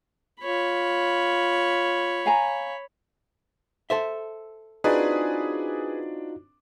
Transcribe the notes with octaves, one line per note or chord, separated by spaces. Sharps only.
F4 C#5 B5
F5 G#5 A#5
A4 C5 E5
C4 D4 D#4 F4 F#4 G#4 B4 D5